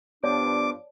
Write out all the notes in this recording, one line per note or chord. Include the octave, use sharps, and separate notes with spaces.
G2 F3 B3 D4 C#5 D5 A5 D6